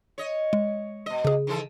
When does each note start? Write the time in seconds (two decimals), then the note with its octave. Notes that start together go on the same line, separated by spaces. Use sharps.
0.18 C#5 D#5
0.53 G#3
1.06 B2 D#5
1.25 C#3 G#4
1.47 D#3 E3 A4